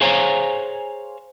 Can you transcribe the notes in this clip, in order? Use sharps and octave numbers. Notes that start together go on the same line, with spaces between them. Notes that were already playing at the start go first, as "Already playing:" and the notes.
G#4 C5 C#5 F5 G#5 A#5